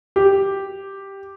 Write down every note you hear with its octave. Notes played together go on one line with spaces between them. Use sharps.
G4